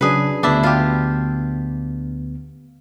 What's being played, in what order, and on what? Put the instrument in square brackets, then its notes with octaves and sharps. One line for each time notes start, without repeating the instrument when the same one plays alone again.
[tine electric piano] C#3 F#3 D4 [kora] G#4 B4
[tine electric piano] D2 B3 [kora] D4 E4 E5
[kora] F4 G4